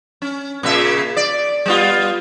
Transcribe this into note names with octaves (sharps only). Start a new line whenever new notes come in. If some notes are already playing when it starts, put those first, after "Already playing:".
C#4
A#2 C#3 E5
D5
G3 B3 F4